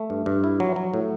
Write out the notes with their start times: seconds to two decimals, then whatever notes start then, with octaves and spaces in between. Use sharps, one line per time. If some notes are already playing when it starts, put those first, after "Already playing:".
Already playing: A3
0.10 G2
0.26 G2
0.44 E4
0.60 F#3
0.76 F#3
0.94 A2